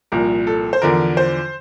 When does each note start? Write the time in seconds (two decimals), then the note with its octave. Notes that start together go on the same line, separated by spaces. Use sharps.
0.12 C2 A#2 F3 A#4
0.47 A4
0.73 C5
0.82 E2 D3 F3 A#4
1.17 C5